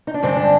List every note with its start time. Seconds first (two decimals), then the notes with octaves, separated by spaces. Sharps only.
0.07 D#4
0.14 D4
0.23 G2 D3 G#3 C4
0.37 D4